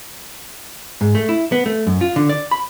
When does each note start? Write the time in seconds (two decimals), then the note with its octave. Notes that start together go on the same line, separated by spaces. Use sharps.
1.01 G#2
1.15 A3
1.29 E4
1.52 B3
1.66 A3
1.87 F#2
2.01 F4
2.16 D3
2.29 D5
2.51 B5